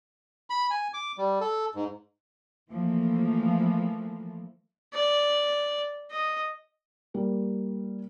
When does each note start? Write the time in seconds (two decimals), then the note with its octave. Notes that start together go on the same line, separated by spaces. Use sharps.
0.50 B5
0.70 G#5
0.94 D6
1.18 G3
1.41 A4
1.75 G#2
2.71 E3 F3 A3 A#3
4.94 D5
6.12 D#5
7.14 G3 A#3